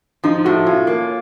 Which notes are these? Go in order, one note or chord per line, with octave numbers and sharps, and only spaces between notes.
F3 D#4
A2 F#4
C#4 F4
A#3